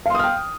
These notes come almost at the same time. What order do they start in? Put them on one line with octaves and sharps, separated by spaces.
F5 C6 D#6 F6 G5